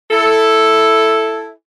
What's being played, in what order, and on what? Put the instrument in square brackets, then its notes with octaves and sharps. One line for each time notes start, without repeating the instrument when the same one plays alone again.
[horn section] E4 A4